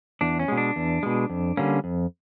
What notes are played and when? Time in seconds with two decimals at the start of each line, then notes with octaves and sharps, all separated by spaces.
0.21 E2 D4
0.39 C#4
0.48 B2 G#3
0.57 D4
0.76 E2
1.03 B2 G#3
1.30 F2
1.57 D3 G3 A#3 C#4
1.84 F2